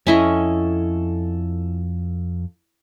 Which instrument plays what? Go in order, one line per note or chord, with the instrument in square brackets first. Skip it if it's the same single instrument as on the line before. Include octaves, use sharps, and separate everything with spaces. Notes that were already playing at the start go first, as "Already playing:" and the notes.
[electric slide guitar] F2 A4 [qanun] C#4 E4 D#5